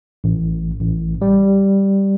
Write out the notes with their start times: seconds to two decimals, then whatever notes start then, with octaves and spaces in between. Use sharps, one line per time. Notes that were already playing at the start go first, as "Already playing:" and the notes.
0.24 A1
0.81 A1
1.22 G3